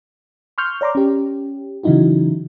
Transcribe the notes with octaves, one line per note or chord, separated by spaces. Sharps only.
C6 C#6 F6 G6
C#5 D5 A#5 C6 D6
C#4 G4
C#3 E3 F#3 D#4 E4 F#4